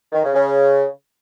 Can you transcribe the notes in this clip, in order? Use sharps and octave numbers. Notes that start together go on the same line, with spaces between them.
D#3
C#3
C#3